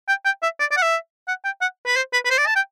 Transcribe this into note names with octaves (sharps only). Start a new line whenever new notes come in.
G5
G5
E5
D5
D5
F#5
E5
F#5
G5
F#5
B4
C5
B4
B4
C5
D5
A5
G5